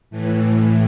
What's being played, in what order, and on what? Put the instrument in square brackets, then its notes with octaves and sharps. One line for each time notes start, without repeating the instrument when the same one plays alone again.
[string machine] A2 E3